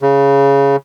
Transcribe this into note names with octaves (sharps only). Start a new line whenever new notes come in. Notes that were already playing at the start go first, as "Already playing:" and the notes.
C#3